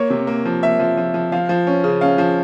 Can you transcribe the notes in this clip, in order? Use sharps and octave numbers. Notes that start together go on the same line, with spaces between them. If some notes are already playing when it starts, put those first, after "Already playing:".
Already playing: A#3 C#5
C3
A#3
F3
A#3 E5
F3
F3
F3
F3 F5
F3
C#4
C#3
C#4 F5
F3